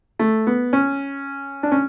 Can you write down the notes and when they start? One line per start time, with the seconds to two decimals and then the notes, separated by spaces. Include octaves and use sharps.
0.19 A3
0.47 B3
0.73 C#4
1.63 D4
1.72 C#4